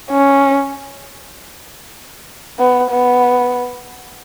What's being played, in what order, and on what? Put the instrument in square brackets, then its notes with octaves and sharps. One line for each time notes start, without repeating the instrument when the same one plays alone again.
[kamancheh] C#4
B3
B3